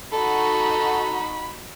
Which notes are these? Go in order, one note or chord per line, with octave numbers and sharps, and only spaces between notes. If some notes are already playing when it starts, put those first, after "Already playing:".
D#4 F#4 A4 B5